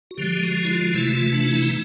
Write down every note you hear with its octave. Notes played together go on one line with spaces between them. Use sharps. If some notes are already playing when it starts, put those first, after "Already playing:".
F#4
D3 F3 G#3 G4
F#4
E4
F4
C3 E3 A3 E4
F4
D4
D#4
E4
D#4